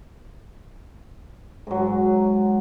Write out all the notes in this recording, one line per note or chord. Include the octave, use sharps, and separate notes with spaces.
G#2 F#3